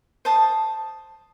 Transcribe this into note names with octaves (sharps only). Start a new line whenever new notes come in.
C5 A5 D#6